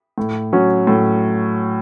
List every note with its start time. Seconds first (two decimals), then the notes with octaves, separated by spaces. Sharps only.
0.18 A2
0.53 F#3 C#4
0.87 A2